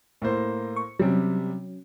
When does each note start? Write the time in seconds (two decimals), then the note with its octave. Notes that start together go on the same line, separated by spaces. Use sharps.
0.22 A2 A#3 C5
0.76 C#6
0.99 C3 F#3 G3 C#4